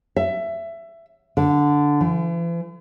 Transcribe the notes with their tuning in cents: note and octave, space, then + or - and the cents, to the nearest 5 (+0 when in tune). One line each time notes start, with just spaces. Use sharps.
E5 +20
D3 -5
E3 +45